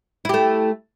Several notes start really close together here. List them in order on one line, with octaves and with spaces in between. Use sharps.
E4 G4 A3